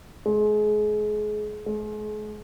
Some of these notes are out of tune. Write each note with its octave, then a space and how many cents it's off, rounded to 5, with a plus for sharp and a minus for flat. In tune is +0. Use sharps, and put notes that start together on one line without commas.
G#3 +30
G#3 +40